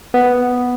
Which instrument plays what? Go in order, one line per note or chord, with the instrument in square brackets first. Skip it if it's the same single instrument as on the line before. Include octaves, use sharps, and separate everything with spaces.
[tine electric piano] B3